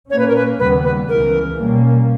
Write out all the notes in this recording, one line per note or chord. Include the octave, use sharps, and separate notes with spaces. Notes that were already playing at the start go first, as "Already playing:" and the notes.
A#2 A#3 C#4 C#5
B4
A#4
B4
D#2 C#3 G3 B3 B4
B4
C#2 C#3 E3 A#4
B2 G3 A#3 C#4